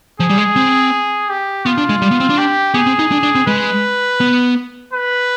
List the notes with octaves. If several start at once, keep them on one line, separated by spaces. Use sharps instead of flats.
F3 G#4
G3
G#3
C4
G4
B3 F4
D4
G#3
G3
B3
C4
D4
G4
B3 G#4
C4
D#4
D4
D4
C4
G#3 B4
B3
B4